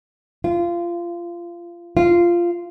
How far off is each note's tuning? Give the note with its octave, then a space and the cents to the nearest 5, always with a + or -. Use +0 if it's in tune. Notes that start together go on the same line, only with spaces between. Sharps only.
F4 -20
F4 -10